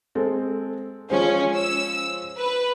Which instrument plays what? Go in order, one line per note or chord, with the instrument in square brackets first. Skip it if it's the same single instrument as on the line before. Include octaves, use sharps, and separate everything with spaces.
[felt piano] G#3 C4 A4
[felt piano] F3 G#3 C5 [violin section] C#4
[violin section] E6
B4